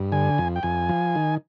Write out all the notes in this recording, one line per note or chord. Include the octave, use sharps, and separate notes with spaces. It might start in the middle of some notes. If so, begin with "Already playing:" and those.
Already playing: G2
D3 G#5
F2
G5
F2 G#5
F3
D#3